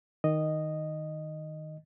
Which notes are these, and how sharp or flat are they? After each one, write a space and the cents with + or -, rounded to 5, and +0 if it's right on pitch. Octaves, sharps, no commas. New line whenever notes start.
D#3 +0 D#5 -10